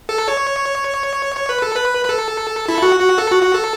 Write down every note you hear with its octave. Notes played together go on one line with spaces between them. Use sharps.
A4
C#5
C#5
B4
A4
B4
B4
A4
E4
F#4
F#4
A4
F#4
F#4
A4